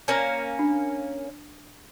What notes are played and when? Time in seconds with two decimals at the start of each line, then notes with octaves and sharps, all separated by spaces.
0.08 A#3 C#4
0.59 D4